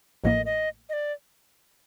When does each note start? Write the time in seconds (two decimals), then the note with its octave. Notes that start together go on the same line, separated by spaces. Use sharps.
0.24 A1 A2 F3 A#3 D#5
0.46 D#5
0.89 D#5
0.93 D5